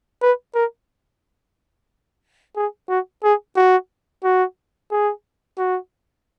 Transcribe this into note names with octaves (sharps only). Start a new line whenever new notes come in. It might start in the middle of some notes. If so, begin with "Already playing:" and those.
B4
A#4
G#4
F#4
G#4
F#4
F#4
G#4
F#4